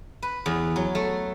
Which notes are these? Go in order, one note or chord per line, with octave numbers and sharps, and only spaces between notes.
B4
E2
F#3
A3